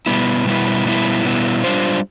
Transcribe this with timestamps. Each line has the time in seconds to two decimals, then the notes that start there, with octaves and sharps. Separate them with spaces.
0.06 B2 G3 B3 E4
0.45 B2 G3 B3 E4
0.85 B2 G3 B3 E4
1.25 B2 G3 B3 E4
1.64 G3 D4 F4 C5